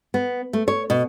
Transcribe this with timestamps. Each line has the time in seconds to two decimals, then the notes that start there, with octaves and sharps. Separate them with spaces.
0.14 B3
0.53 A3
0.68 C#5
0.90 B2